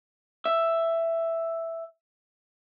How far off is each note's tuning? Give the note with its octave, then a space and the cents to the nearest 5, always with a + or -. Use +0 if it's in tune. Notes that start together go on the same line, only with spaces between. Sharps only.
E5 +5